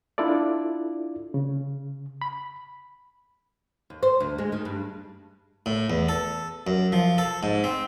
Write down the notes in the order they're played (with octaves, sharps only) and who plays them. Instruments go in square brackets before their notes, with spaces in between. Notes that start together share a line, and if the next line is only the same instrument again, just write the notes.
[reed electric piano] D4 E4 F4 A4 D5
C#3
B5
[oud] D#2
C5
D2
G#3
D#3
G2
[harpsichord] A2
E2
A4
F#2
F3
A4
G#2
C4